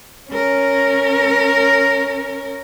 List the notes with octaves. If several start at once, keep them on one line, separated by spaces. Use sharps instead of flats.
C#4 A#4